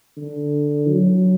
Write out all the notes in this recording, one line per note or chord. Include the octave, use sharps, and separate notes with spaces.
D3
F#3